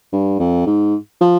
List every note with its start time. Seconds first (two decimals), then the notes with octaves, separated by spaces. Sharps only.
0.12 G2
0.39 F2
0.66 G#2
1.21 F3